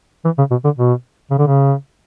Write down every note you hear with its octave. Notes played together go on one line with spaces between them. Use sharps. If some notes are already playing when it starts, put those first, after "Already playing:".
E3
C#3
B2
D3
B2
C#3
D3
C#3